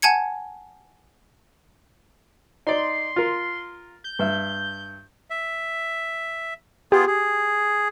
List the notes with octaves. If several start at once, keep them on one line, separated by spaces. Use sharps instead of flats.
F#5 G#5 A5 G#6 C#7
D#4 D5 C6
F4 A#4
G6
G2 E5
E5
B3 F4 G4 G#4
G#4